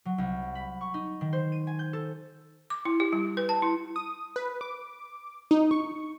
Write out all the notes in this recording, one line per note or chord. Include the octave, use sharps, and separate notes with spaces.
F#3
C2
B5
C#6
D#4
D#3
C5
D#7
G#5
G6
A4
D6
E4
G4
G3
B4
A5
E4
D#6
B4
D6
D#4
C#6